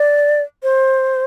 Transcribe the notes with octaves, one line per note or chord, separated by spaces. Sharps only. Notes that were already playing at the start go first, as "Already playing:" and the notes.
Already playing: D5
C5